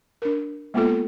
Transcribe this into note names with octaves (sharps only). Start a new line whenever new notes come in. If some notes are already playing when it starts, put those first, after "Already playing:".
D4 A#4
G#3 A#3 B3 F4 A4